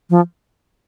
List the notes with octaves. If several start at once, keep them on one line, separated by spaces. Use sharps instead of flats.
F3